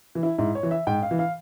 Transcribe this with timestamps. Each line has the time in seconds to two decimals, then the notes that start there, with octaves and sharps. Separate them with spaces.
0.15 E3
0.23 E4
0.38 G#2 E4
0.55 C#5
0.63 E3
0.71 E5
0.87 G#2 G5
1.03 F5
1.11 E3
1.19 F5